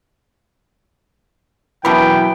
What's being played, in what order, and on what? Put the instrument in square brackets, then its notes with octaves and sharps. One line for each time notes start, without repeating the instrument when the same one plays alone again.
[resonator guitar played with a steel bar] F#2 B2 [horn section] E3 [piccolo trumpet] G5 [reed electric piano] B5